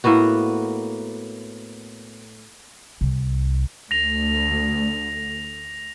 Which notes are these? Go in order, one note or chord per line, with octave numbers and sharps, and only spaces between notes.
A2 A#3 B3 F#4
C2
D2 A#6 F7